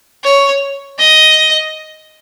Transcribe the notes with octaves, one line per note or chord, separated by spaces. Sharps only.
C#5
D#5